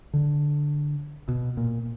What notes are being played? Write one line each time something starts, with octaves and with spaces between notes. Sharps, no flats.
D3
B2
A#2